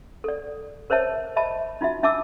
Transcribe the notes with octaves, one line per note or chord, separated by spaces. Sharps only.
A4 D5
A#4 C5 C#5 E5 A5
D#5 E5 A5 B5
D#4 F4 F#4 E5
D4 E5 A5 D6 E6